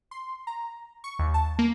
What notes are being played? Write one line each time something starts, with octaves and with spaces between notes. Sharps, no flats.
C6
A#5
C#6
D#2
A5
A#3